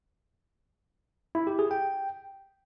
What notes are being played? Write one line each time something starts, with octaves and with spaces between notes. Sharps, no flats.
E4
G4
G#4
G5